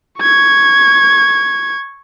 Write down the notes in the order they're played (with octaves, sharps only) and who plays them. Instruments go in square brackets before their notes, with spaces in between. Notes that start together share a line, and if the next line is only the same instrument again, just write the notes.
[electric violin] C#6 G#6